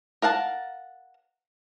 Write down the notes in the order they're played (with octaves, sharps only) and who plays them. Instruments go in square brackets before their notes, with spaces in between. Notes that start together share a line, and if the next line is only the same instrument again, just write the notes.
[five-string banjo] A#4 F5 F#5 A5